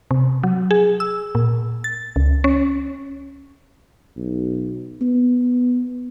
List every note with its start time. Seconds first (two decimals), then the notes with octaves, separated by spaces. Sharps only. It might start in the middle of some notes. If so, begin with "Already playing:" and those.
0.11 C3
0.43 F#3
0.71 G#4
1.00 E6
1.35 A#2
1.84 A6
2.16 C#2
2.44 C#4
4.17 B1
5.01 B3